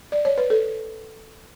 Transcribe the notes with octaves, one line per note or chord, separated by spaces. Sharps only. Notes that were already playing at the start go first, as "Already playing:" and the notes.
D5
C#5
B4
A4